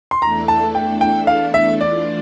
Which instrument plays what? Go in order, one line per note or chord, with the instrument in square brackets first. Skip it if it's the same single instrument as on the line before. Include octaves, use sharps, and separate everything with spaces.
[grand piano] C6
[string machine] E2 E3 A3 D4 A4 [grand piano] A#5
[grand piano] A5
G5
G5
F5
E5
[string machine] E3 A3 D4 F4 [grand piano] D5